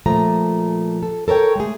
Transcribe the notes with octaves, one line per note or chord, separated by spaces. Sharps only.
A#2 F3 A3 A#5
A4
A4 A#4 C#5 G5
G#3 A3 G#4